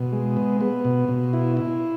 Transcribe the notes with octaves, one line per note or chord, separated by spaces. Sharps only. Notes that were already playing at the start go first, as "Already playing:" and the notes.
Already playing: B2
G#3
B3
B3
B2
B2
E4
E4